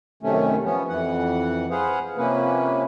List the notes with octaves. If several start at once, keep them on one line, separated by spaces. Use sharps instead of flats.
F#2 C3 D#3 A3 C#4
F3 B3 C#4
F2 E3 F#5
G#4 B4 C5 F5 F#5
C3 F3 A#3 C#4 B4